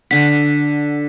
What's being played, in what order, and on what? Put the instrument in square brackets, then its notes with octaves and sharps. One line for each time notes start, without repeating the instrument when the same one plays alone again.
[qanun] D3 F#5 [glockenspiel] B6